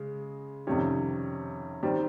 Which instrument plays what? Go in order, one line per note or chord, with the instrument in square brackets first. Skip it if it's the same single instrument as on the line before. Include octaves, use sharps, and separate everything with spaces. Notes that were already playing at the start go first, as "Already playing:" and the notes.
Already playing: [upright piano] C#3 G#3
F2 C3 D#3 G3 C#4
D#3 G3 C4